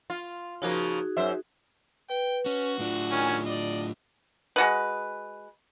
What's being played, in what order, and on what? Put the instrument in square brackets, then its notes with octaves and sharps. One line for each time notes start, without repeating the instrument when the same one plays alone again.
[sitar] F4
[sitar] C#3 F3 A#3 [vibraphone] D#4 F#4 G#4
[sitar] F#2 C5 E5
[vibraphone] B4 [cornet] G5
[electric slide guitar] C#4 [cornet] F#4
[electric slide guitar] A2 D4 [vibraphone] F4
[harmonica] D#3 C#4 G#5
[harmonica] D5 [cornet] D#5
[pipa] G#3 F#4 B4